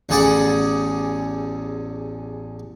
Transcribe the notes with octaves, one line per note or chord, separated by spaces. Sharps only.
A1 E2 D3 G#4 D5 F#5